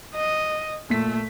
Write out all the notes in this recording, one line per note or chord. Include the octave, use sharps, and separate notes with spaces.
D#5
A#2 A3 B6